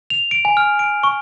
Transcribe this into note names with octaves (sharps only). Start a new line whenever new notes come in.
F7
D7
G#5
F6
D7
C#6